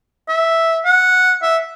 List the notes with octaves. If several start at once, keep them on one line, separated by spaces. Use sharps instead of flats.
E5
F#5
E5